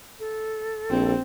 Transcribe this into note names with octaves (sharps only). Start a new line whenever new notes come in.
A4
A#1 C4